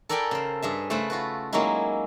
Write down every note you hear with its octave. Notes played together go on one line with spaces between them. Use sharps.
A4 A#4 D5 G5 G#5 B5
C#3 C5
G2 G#4 E5
C#3 A3 A4 B4 C5 B5
F4 F#4 B4
F#3 G#3 A#3 C#4 D#4 E4